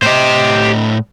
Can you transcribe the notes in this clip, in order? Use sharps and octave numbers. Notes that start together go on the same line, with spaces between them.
A2 G4 C5 D#5